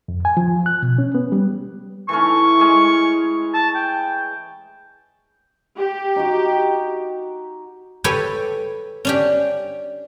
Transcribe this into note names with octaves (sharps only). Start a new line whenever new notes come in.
F2
G#5
F3
F#6
B2
C#4
B3
G3
E3 A3 C#4 C#6
G#3 C#4
A5
G5
G4
D#4 F#4
G4 A4 B4 C#5 G5 G#5
C#4 D4 G4